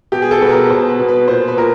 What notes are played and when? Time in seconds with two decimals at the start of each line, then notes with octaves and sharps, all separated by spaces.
0.12 B2 G4
0.22 G#4
0.31 A4
0.41 B2 B4
0.51 A#4
0.70 B2 C5
0.89 B4
1.00 B2
1.08 B4
1.28 A#2 C5
1.48 B4
1.56 A#2 A#4